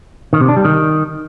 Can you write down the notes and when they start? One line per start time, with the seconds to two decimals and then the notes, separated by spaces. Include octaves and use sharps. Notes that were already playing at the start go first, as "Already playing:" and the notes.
0.33 D#3
0.41 C3
0.49 D4
0.57 G3
0.65 D#3